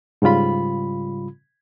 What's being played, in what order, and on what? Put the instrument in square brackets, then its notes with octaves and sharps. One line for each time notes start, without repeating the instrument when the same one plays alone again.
[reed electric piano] G#2 C#3 G3 F4 B5